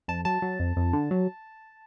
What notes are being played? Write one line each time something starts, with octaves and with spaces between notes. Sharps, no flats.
F2 A5
F#3 A5
F#3
F2
F2
D3
F#3